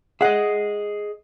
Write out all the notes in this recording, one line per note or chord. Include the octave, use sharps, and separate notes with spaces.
G#4 D#5 E5 F#5